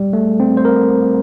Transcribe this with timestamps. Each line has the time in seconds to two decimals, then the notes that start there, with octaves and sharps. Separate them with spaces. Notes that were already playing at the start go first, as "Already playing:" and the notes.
Already playing: G3
0.13 A3
0.40 C4
0.57 C5
0.65 A#4